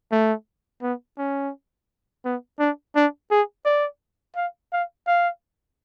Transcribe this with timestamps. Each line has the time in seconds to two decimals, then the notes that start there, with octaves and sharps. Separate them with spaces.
0.12 A3
0.82 B3
1.19 C#4
2.25 B3
2.59 D4
2.96 D4
3.31 G#4
3.65 D5
4.36 F5
4.73 F5
5.07 F5